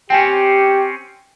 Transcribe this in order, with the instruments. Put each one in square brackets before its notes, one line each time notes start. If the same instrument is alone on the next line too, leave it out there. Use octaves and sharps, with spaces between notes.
[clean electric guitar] C4 C#4 [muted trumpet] G4 [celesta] G5 G#5